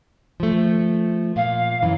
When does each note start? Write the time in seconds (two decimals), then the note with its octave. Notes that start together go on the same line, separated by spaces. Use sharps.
0.40 F3 A3
1.36 A#2 F5
1.82 F#2 E3